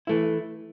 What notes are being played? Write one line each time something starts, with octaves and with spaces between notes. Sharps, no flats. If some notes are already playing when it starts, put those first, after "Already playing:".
E3 A3 E4